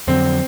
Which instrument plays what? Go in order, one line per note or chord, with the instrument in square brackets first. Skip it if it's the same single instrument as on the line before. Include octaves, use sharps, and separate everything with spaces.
[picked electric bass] F2 D3 F#3 [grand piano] C4